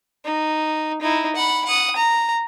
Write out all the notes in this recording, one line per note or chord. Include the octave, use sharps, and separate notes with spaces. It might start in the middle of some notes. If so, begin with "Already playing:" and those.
D#4
D#4 E4
F#5 B5
F#5 D#6
A#5